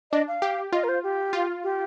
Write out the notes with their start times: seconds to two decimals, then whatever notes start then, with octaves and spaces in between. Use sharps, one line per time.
0.12 D4 D#5
0.28 F5
0.42 G4
0.72 F4 D#5
0.84 A#4
0.89 C5
1.03 G4
1.33 F4
1.64 G4